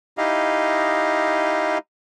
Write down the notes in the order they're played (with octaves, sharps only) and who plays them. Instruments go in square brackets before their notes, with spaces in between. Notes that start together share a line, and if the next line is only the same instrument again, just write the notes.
[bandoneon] D#4 E4 G4 D#5 F5